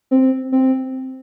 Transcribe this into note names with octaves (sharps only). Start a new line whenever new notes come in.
C4
C4